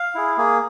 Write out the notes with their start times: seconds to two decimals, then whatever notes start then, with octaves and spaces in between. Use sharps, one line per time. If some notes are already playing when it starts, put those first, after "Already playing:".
Already playing: F5
0.15 E4 G#4
0.37 A#3 G#4